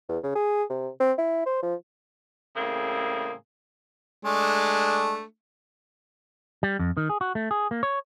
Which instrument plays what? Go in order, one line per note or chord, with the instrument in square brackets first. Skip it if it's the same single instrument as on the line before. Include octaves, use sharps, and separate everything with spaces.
[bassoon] E2
C#3
G#4
C3
C4
E4
C5
F3
[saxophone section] A2 C#3 G3 A#3 C4 G#4
[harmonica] G#3 A3 D4
[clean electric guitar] G3
F2
D#3
G#4
F#4
A3
G#4
A#3
C#5